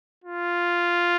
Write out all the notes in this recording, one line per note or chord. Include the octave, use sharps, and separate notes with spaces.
F4